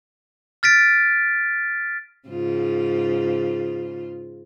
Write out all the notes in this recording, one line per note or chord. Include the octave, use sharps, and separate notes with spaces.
F6 A6 B6 D7
G#2 C#3 F4